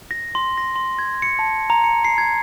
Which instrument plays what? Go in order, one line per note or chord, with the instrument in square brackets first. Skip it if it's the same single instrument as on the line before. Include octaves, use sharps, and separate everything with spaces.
[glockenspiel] A#6
C6
A#6
C6
G#6
C#7
A5
A#5
C#7
C7
G#6